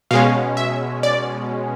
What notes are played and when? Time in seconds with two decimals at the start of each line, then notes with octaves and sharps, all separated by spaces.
0.11 B2 G#3 C#4 F5
0.57 E5
1.03 D5